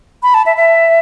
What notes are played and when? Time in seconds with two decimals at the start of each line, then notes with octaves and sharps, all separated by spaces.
0.23 B5
0.34 A5
0.46 E5
0.57 E5